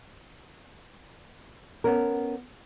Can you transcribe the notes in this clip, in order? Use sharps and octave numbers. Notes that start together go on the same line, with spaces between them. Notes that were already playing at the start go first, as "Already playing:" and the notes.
B3 C#4 A#4